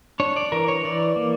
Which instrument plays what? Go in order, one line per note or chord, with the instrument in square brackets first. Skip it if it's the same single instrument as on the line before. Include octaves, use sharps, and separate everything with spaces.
[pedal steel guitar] D4 C#5
D5
E3 A#4
C#5
E3 D5
A#3